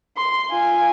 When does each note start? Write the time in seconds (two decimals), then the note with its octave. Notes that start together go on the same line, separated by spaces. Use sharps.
0.17 C6
0.51 F4 G#5